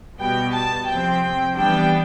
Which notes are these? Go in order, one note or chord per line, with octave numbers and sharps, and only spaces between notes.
B2 G3 B3 G5
A5
C3 F3 C4 G5
E3 G3 B3 D4 G5